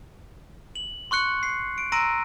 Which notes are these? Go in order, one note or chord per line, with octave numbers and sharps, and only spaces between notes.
F#7
C6 C#6 F#6 C#7
C7
D7
A#5 C6 E6 A#6 D7 D#7